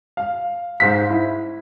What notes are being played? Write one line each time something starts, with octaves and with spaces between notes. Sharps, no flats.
F5
G#2 C5 F5 B6
E4